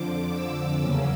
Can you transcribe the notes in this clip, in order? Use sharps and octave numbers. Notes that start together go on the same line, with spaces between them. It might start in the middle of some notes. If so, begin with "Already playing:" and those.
Already playing: F2 D3 F3 D6
E6
E2 C#3 F#3 A#3 C#4